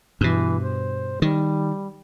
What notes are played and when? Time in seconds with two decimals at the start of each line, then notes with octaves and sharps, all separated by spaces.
0.21 G2 B2 E3
0.62 C5
1.22 D#3 G3